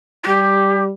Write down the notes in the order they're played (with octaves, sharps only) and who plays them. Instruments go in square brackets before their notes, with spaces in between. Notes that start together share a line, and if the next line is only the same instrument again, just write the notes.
[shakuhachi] F4
[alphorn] G3 [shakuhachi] G4